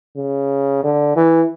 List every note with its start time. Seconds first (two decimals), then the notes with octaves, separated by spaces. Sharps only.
0.17 C#3
0.84 D3
1.16 E3